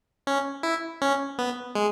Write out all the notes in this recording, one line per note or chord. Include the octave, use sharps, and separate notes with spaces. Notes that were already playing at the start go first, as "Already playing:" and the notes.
C#4
E4
C#4
B3
G#3